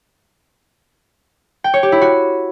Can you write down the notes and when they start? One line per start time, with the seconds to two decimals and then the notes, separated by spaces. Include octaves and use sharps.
1.64 G5
1.74 C#5
1.83 G4
1.92 E4
2.01 F#4